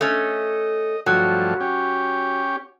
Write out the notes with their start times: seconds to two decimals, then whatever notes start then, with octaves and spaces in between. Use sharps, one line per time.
0.01 A3 C#4 D#5
1.06 G2 F3 F#3 A3
1.60 C#4 G4